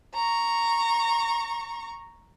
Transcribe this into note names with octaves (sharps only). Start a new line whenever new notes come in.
A#5 C#6